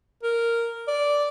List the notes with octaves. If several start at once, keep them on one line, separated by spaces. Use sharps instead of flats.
A#4
D5